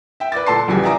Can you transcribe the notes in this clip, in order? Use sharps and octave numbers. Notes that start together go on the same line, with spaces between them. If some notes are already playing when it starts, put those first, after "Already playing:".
E5 G5
B4 D5 D6 A6
A#2 A4 A5 C6 C7
A#1 C#3 E3 F#3 G4 G#5
D5 E5 F#5 A#5 D6 D#6